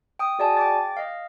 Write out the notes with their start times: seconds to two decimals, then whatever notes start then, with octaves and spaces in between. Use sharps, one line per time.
0.19 G5 D#6
0.39 F#4 G#4 D5 D#5 G#5 A5
0.57 G5 D6 A6
0.97 D#5 F5